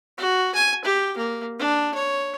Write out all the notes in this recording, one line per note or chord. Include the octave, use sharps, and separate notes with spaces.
F#4
G#5
G4
A#3
D4
C#5